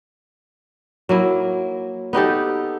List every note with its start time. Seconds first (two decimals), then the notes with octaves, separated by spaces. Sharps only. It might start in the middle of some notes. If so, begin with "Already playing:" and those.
1.09 F#3 A#3 E4
2.13 B3 D#4 G4 A4